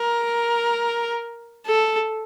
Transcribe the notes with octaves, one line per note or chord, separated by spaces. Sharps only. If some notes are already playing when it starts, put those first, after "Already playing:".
Already playing: A#4
A4